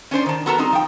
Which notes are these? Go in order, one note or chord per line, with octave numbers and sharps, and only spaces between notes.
C#4 D4 C5 D5
D#3 A5
B3 F#4 A4 A#4 A5 A#5
G3 C4 D#4
F3 G5